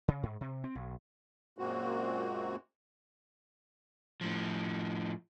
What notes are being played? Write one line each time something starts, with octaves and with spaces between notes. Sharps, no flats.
C#3
G#2
C3
C4
B1
F#2 A#2 G#3 A#3 C4 F#4
A2 F3